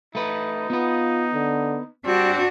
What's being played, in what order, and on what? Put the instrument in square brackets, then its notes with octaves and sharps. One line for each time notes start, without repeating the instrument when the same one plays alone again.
[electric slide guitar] A3 B4 [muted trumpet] D#4
[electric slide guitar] B3 B4 [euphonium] F4
[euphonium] D3
[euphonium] G3 [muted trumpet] C4 [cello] D4 F#4